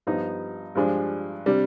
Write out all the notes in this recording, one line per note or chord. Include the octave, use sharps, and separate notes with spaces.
G2 F3 B3 D#4
G2 F3 G#3 D4
C3 G3 D4